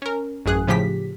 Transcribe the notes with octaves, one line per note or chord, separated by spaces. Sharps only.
C#4 A#4
A1 F#2 G#4 F#6
A2 C#3 F3 G4 B6